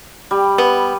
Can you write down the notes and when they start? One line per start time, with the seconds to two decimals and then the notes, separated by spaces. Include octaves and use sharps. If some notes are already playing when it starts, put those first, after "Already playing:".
0.31 G3
0.58 B3